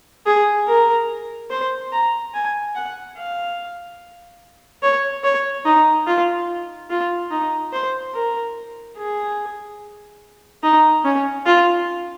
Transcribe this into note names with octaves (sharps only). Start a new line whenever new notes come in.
G#4
A#4
C5
A#5
G#5
F#5
F5
C#5
C#5
D#4
F4
F4
D#4
C5
A#4
G#4
D#4
C#4
F4